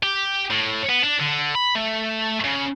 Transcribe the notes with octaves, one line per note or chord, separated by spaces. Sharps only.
G4
A2
B3
D4
D3
B5
A3
C#3